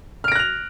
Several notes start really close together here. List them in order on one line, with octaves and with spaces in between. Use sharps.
F6 D7 A#6 F#6 F7